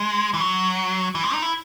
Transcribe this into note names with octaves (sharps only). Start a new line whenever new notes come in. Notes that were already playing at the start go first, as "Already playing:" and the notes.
Already playing: G#3
E3
F#3
E3
G#3
D#4
E4